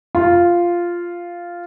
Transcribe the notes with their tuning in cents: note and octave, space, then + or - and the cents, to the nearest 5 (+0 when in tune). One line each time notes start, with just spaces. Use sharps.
F4 -5